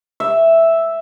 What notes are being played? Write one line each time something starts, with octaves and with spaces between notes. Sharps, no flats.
E5